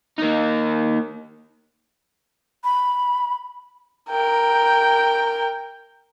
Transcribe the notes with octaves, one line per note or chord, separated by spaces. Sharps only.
A#3 D#4
B5
A#4 G5